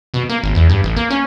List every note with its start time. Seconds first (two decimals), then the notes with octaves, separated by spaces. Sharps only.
0.14 B2
0.29 A#3
0.43 G#1
0.55 E2
0.70 G2
0.84 A1
0.96 A#3
1.10 C#4